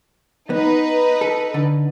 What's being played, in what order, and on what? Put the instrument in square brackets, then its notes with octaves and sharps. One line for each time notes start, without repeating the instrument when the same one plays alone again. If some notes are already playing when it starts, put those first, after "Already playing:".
[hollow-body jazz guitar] B3 [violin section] D#4 B4
[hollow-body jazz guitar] A4
D3